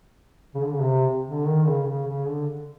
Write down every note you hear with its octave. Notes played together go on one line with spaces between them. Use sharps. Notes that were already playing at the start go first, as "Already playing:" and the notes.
C#3
D3
C#3
C3
D3
D#3
C#3
C#3
C#3
D3